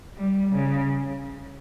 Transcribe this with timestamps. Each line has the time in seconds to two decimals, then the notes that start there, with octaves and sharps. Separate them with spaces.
0.17 G3
0.53 C#3